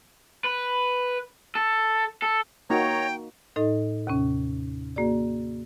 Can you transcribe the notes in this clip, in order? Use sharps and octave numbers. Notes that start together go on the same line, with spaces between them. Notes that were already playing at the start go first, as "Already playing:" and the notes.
B4
A4
A4
A#3 D#4 F#4 C#5 G5 A#5
A2 D#4 A4 D#5
D#2 C3 C#4
A#3 F#4 G#4 D5